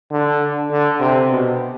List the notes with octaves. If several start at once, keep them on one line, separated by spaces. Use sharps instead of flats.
D3
D3
C3
B2